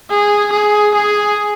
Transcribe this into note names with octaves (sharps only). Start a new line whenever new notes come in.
G#4
G#4
G#4